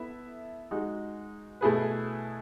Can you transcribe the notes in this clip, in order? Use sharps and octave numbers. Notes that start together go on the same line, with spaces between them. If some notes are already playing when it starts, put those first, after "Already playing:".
Already playing: B3 E4 A4 E5
G#3 D#4 F#4
B2 A3 E4 G#4 B4